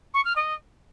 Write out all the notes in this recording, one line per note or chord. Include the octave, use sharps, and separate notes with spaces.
C#6
F6
D#5